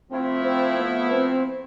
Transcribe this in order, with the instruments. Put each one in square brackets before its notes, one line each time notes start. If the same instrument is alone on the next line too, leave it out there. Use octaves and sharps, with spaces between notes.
[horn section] F3 A3 E4 [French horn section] C4
[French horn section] C4
B3
C4